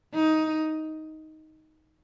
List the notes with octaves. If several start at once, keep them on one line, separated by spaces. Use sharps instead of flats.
D#4